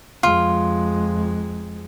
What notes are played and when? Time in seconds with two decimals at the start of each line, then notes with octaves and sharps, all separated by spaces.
0.23 F2 G#3 F4